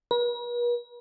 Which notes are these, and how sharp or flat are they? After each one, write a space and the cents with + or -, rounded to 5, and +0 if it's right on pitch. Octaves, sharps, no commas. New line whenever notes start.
B4 -45